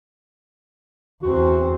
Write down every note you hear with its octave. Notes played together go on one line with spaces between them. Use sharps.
E2 C4 F#4